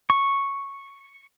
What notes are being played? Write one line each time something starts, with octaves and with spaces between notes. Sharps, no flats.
C#6